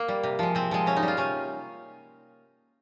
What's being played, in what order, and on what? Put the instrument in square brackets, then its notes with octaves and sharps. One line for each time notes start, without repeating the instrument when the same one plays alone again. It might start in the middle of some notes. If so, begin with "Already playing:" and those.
Already playing: [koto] A#3
G3
C3
F3 G#3
C3 C4
F3 G#3
C3 C#4
D#4
G3
F4
C3 C#4